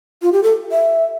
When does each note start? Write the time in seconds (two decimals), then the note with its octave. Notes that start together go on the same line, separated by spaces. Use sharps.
0.22 F4
0.32 G4
0.43 A4
0.71 E5